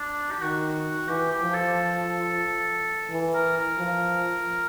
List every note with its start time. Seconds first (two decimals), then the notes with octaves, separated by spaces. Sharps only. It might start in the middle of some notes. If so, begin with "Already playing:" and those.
Already playing: D4
0.31 G4
0.41 D#3 F#4
1.08 E3 G4
1.31 G4
1.42 F3
1.54 A4
3.11 E3
3.34 A#4
3.57 A#4
3.79 F3